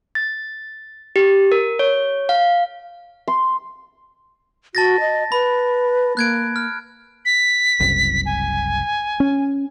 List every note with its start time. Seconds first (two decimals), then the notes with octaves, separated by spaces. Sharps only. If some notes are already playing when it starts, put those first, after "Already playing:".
0.15 A6
1.16 G4
1.52 A#4
1.79 C#5
2.29 F5
3.28 C6
4.75 F#4 A5 A6 A#6
5.00 D#5
5.32 B4 B5
6.17 A#3 F#6 G#6 D7
6.56 F6
7.25 B6
7.80 F#1 C2
8.26 G#5
9.20 C#4